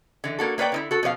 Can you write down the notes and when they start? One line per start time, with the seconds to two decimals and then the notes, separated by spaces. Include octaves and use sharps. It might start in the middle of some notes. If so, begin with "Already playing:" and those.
0.24 D3 E3
0.39 A#3 F#4 A4
0.58 A#3 B4 C#5 D5 G5
0.72 D3 D#4 E4
0.91 F#4 A4
1.03 B2 F3 C#5 F5